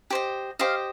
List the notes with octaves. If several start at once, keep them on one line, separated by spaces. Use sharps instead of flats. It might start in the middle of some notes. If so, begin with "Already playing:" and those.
G4 C5 D#5
G4 C5 D#5 F5